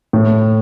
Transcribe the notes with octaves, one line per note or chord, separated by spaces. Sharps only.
A2